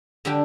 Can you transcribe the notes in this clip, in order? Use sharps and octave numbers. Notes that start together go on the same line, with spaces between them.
D3 G3 D4 G4